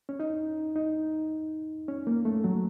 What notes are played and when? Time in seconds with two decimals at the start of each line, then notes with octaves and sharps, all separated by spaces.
0.09 C#4
0.20 D#4
0.76 D#4
1.88 C#4
2.07 A#3
2.25 A3
2.44 F#3